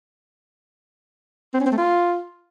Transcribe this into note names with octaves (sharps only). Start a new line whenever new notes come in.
C4
C#4
C4
A3
F4